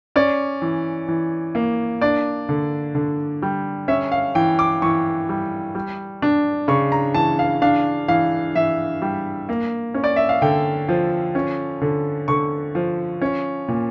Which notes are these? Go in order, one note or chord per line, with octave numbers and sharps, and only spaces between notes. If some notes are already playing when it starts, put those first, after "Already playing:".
C#4 D5
E3
E3
A#3
D4 D5
D3
D3
G3
C#4 E5
F5
E3 G5
D6
E3 C#6
G3
G3
D4
C#3 C#6
A#5
E3 A5
F5
D4 F5
E3 F5
E3 E5
G3
A#3
C#4
D5
E5
F5
D3 G5
F3
C#4
D3
D3 C#6
F3
C#4
A#2